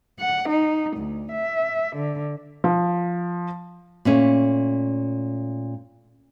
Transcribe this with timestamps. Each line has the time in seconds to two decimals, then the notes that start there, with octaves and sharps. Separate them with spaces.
0.18 F#5
0.49 D#4
0.96 D2
1.32 E5
1.96 D3
2.64 F3
4.05 A#2 A3 C#4